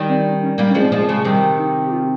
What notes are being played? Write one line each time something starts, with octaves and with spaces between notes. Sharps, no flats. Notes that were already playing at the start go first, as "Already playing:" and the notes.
Already playing: D#3 G3
C4
D#4
C#4
G3 A#3 D#4
F3 G#3 C#4
C4
F3 G#3 A#3
C#3 F3 G#3
C3 D#3 G3
D#4
G4
F4